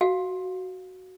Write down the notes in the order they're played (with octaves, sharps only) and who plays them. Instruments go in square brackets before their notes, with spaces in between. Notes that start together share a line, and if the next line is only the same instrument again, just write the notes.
[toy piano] F#4 F5